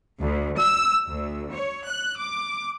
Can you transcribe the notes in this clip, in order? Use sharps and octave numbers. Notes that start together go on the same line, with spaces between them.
D2
E6
D2
C#5
F#6
D6